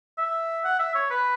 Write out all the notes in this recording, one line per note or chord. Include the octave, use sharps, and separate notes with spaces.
E5
F#5
E5
C#5
B4